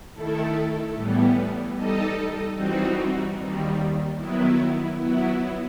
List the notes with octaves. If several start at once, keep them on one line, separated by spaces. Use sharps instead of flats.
D#3 A3 E4 A4
A2 E3 G3 B3
G3 D#4 A4 D#5
E3 G3 C4 D#4 F#4
D#2 D#3 G3
D#3 F#3 B3 E4
F#3 B3 E4